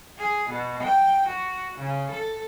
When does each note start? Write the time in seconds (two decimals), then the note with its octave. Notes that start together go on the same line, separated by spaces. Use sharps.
0.18 G#4
0.48 B2
0.82 G5
1.28 F#4
1.77 C#3
2.11 A4